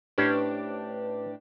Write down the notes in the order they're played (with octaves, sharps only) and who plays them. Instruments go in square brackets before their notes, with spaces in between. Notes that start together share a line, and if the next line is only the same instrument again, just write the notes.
[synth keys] A2 D4 G4 [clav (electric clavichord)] C#4 C5 [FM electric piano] B4